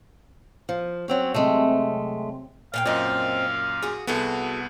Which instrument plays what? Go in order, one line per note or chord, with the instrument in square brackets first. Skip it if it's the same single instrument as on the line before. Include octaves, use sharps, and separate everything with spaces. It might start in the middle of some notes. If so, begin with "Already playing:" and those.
[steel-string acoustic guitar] F3
F#3 C4 C#4
[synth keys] C3 F#3 C4 [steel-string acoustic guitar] G#3 A3
[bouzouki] A#2 F4 G5 [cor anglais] F5
[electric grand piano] F#2 A#2 [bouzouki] C4 D#5
[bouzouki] F#4 G#4
[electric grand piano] C2 B3 [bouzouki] F#4 G#4 A4